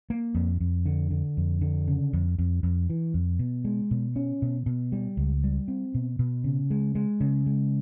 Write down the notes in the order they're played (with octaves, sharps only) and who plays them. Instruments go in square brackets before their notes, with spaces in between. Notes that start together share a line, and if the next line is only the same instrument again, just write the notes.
[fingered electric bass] A#3
F2
F2
D3
D3
F2
D3
C#3
F2
F2
F2
E3
F2
B2
G#3
B2
C#4
B2
B2
G3
C#2
G3
C4
B2
B2
C#3
G#3
G#3
C#3
G#3